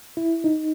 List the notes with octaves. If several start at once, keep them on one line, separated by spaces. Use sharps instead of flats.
E4
D#4